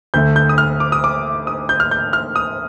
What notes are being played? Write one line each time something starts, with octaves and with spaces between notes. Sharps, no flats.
D2 D3 A3 G6
G6
D#6
F6
D6
D#6
D6
D#6
G6
F6
G6
F6
D#6